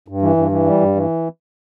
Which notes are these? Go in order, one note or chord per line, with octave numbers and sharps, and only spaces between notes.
G2
E3
G2
E3
G3
G2
E3